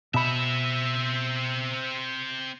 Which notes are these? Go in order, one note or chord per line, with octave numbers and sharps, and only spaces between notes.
B2 C4 E5 B5